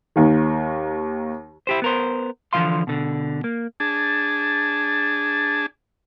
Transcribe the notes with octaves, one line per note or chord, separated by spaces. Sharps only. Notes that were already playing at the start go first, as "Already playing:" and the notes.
D#2 D#3
E4 G4 C5
B3 A#4 C5
D3 E3 F3 F5 C6
B2 D3
A#3
D4 G#4 A5